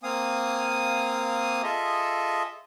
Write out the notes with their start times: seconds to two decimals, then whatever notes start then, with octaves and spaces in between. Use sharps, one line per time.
0.03 A#3 C4 F5 G#5 D#6
1.63 F4 G#4 A4 D#5 E5